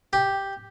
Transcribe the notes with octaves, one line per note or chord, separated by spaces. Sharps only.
G4